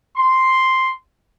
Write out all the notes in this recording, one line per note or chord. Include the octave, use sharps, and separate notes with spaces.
C6